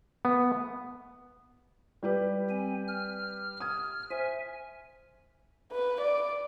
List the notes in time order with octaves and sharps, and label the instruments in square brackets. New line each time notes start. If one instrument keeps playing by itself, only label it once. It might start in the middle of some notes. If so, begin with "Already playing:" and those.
[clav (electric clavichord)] B3
[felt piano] G3 G4 B4
[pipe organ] C4 G#5
F6
[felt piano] D#6 G#6
[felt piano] C5 [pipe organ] E5 G#5
[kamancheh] B4
D5